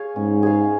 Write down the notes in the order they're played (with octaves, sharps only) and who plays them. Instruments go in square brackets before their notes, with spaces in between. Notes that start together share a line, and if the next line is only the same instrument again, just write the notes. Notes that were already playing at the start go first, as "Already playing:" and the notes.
Already playing: [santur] G#4 C#5 F5
[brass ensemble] G#2 [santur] C#4
[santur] G#4 C#5 F5